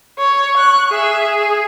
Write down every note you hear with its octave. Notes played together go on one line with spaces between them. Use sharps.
C#5
C#6 F#6
G#4 E5
G#4